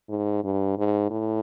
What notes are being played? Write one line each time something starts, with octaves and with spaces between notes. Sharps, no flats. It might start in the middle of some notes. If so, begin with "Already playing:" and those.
G#2
G2
G#2
A2